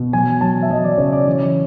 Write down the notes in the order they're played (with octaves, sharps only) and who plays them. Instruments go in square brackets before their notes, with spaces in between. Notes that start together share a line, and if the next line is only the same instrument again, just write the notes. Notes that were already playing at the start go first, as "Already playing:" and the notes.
Already playing: [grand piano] B2
F#3 G#5
F#3 A5
E5
F#3 D#5
D5
C#3 C#5
D5
E3 C#5